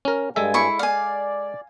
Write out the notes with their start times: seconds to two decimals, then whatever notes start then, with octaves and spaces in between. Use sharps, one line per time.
0.05 C#4 A#4
0.36 G2 G3 G#3 A4 E5 G#5
0.54 E4 C#6
0.79 D5 F5 G#5